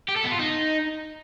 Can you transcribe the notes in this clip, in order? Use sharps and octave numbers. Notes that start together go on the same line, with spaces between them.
G4
A4
B3
F4
D#4